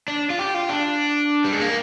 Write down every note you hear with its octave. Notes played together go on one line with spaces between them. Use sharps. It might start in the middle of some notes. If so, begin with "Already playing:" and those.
D4
F4
G4
F4
D4
G3
G#3
A#3